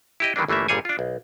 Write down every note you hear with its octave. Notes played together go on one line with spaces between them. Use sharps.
E4 G4 D#5
D#3 E3 G3 A#3 D4
G1 E3 A3 A#3 E5
G1 A#2 G3 G#4 C#5 G#5
D4 F4
B1